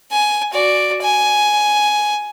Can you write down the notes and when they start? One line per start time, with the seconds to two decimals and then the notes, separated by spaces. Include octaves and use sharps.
0.12 G#5
0.53 F#4 D5
1.02 G#5